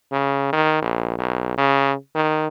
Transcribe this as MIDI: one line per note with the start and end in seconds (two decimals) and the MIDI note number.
0.12 0.49 49
0.53 0.79 51
0.82 1.16 34
1.18 1.53 35
1.58 1.94 49
2.15 2.48 51